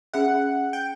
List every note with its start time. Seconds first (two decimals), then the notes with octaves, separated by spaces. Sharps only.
0.13 C#4 G#4 E5 F#5
0.73 G5